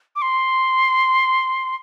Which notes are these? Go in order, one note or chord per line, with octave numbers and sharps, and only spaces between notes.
D6
C6